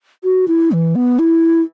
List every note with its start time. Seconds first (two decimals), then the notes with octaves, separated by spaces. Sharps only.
0.24 F#4
0.48 E4
0.72 E3
0.95 B3
1.19 E4